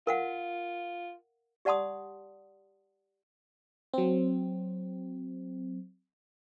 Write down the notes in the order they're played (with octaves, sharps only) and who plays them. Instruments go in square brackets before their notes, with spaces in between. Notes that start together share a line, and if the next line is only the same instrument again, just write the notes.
[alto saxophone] F4 [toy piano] A#4 F5 F#5
[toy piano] G4 D5 F#5 A5 C6 D#6
[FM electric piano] F#3 C4